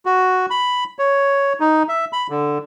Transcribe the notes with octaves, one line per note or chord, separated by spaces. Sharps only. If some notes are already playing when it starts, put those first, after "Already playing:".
F#4
B5
C#5
D#4
E5
B5
D3